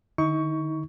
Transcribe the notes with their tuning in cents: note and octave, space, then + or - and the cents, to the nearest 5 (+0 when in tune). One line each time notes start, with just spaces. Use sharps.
D3 +45 D#4 +35 C#6 +15